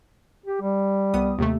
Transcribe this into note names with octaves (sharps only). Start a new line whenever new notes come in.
G4
G3
C2 B3 D#6
D#2 C3 A3